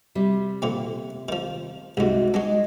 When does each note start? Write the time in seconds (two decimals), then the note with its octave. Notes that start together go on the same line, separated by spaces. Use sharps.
0.15 C3 G3
0.62 A#2 D3 C4
1.29 D#3 F3
1.97 C2 G#2 C3 D#4 F#4
2.34 G#3 D4 F#4 D#5